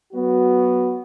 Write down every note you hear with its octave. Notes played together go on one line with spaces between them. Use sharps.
F#3 B3 F#4